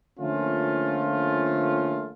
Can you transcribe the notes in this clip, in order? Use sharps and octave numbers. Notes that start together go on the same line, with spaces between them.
D3 F3 A3 A#3 C#4 F4